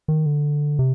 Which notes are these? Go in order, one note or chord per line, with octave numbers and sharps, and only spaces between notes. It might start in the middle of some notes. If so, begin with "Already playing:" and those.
D#3
D3
C3